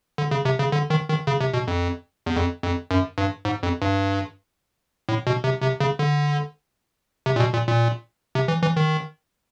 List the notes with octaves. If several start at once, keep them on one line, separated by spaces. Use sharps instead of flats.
D3
C#3
C3
C#3
D3
D#3
D#3
C#3
C3
B2
F2
E2
F2
F2
F#2
G2
G#2
F2
G2
A2
B2
C3
C3
C#3
D3
C3
A#2
B2
A#2
A#2
C3
E3
E3
D#3